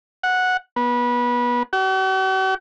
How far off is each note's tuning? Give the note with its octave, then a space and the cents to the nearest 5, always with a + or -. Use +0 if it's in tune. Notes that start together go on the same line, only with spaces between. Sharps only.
F#5 -10
B3 -25
F#4 +45